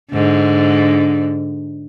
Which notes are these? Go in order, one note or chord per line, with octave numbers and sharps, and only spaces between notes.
G#2 D3